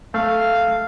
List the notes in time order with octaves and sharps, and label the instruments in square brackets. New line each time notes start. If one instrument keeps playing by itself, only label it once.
[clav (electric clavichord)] A3 [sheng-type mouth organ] F5